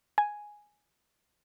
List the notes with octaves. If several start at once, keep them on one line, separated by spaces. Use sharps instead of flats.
G#5